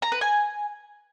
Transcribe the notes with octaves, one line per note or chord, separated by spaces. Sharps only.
A#5
B4
G#5